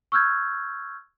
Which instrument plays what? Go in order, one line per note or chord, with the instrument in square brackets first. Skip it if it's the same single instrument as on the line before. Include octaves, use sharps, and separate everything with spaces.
[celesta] C#6 E6 F6 G6 G#6